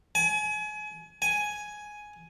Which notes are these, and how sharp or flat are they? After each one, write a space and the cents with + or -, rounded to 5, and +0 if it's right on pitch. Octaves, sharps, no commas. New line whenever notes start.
G#5 +30
G#5 +5